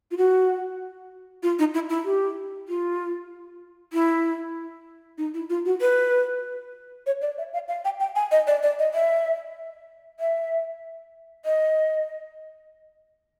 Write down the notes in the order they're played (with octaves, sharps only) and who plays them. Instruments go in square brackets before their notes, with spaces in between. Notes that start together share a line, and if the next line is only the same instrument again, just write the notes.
[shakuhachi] F4
F#4
F4
D#4
E4
E4
G4
F4
E4
D#4
E4
F4
F#4
B4
C#5
D5
E5
F5
F5
G5
G5
G#5
D#5
D5
D5
D#5
E5
E5
D#5